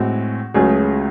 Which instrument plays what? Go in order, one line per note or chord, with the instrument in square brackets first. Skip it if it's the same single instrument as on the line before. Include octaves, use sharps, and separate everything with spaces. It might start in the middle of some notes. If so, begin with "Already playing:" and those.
Already playing: [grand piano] A2 G#3 C4 [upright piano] F#4
[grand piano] C#2 C#3 F#3 A3 C#4 [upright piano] G#4